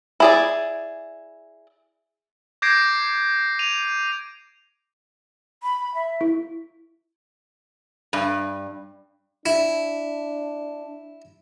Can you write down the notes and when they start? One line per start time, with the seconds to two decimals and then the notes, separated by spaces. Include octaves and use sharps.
0.20 E4 G#4 D5
2.62 D6 G6 G#6 A#6 C7 D7
3.59 D#7 F7
5.63 B5
5.95 E5
6.21 E4
8.13 G2
9.46 D4 E4